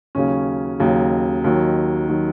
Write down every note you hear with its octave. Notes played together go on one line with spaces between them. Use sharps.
D#2 C#3 F#3 C#4
D#2 C#3 F#3
D#2 D#3 F#3
D#3 F#3